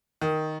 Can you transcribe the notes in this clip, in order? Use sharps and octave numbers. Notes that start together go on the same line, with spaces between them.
D#3